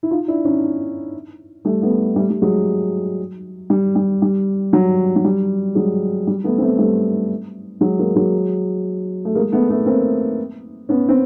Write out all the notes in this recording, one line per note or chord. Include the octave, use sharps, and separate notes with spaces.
E4
D#4 F4
D4 E4
C#4 D#4
G3 A3
A3 B3
G3 A3
G3
F#3 G#3
G3
G3
G3
F#3
F#3
G3
F#3 G#3
G3
A3 B3
C4
A3 B3
G3 A3
F#3 G#3
G#3 A#3
F#3 G#3
A3
G#3 A#3
A3 B3
A3 B3
A#3 C4
B3 C#4
C4